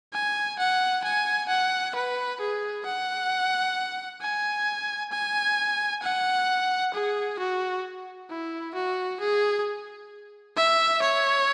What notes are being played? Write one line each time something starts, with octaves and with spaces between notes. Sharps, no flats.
G#5
F#5
G#5
F#5
B4
G#4
F#5
G#5
G#5
F#5
G#4
F#4
E4
F#4
G#4
E5
C#5